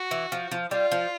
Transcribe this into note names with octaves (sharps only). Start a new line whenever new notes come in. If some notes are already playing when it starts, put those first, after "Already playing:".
Already playing: F#4
E3
F3
F3
G3 F4
F3